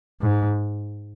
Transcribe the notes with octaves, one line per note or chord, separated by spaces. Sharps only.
G#2